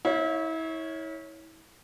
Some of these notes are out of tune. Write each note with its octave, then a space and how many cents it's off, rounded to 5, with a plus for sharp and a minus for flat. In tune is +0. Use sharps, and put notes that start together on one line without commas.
E4 -35 C#5 +0 F5 +20